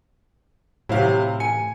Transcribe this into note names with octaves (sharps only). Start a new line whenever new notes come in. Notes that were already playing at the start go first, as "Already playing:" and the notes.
A2 C3 F#3 E4 C5 F5
G#5 C#7